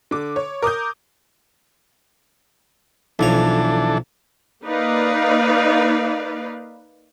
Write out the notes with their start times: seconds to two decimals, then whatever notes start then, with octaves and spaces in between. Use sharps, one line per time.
0.11 D3 D6
0.36 C#5
0.62 A#4 D6 D#6 G6
3.19 B1 E3 F3 D4 A4 C#5
4.64 A#3 D#4 B4 D5 F5